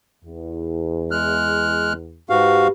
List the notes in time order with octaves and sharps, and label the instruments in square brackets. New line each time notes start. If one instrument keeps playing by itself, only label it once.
[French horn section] E2
[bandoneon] G#3 F6 F#6
[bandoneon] G#2 F#4 F5 [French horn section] G4 B4